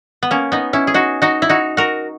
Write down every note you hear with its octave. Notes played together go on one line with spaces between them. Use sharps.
B3
A#3 C#4
B3 D#4
C#4 E4
G#4
D#4 F#4
D#4 F#4
E4
D#4 F#4
F#4 A#4